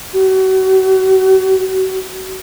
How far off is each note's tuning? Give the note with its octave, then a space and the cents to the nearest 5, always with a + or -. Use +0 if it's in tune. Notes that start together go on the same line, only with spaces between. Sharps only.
F#4 +35